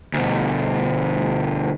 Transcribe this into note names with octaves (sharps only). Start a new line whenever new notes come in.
D2 B2